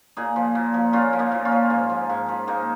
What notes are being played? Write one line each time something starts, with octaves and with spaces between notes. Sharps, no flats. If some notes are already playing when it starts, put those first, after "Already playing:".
A#2 D#4 G#4
F3
A#2
F3
A#2 C#4 F4
F3
A#3 D#4
A#2
C#4 F4
F3
G#2
F3
G#2
F3
G#2 A#3 D#4